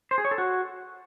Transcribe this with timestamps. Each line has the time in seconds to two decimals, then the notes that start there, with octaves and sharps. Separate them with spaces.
0.11 C5
0.18 G#4
0.25 C#5
0.31 A4
0.38 F#4